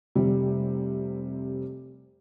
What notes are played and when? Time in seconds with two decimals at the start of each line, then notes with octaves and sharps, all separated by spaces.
0.15 F1 C3 G3